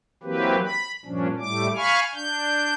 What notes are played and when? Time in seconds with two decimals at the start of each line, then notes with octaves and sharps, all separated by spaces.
0.23 E3 F#3 A#3 C4 G4 B4
0.64 B5
1.05 G2 A#2 F3 C#4 D4
1.40 A2 G3 A3 D6
1.76 F5 G#5 B5 C#6 F6
2.14 D4 G6